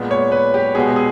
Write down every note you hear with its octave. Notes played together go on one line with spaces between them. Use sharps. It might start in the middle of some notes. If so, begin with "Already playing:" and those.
Already playing: A#2 G#3 B3
C#5
B4
G4
B2 G#3 B3 G#4
G#4